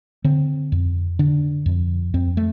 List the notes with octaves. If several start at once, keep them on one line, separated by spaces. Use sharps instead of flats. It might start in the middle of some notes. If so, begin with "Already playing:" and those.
D3 C4
F2
D3 D4
F2
F2 C4
A3